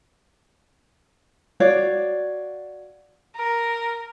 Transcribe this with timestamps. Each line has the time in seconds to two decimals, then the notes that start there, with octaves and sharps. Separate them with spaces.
1.60 F#4 C#5 D5 F5
3.36 A#4